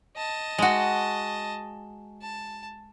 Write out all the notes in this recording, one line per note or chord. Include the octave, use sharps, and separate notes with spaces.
D#5 A5
G#3 F#4
A5